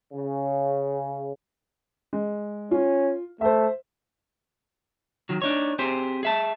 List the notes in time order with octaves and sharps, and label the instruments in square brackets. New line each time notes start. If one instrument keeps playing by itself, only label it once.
[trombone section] C#3
[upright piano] G#3
[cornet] C#4 [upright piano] F4
[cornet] A3 [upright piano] C5 E5
[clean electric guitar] D#3 F#3
D4 D#4 C#5
C4 G4 G#4 C5
G#4 E5 A5